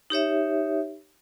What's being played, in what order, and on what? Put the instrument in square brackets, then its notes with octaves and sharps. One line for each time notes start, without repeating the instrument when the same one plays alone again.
[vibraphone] D#4 G4 C#5 E5